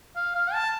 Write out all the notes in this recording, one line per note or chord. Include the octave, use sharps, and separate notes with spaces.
F5
F5
A5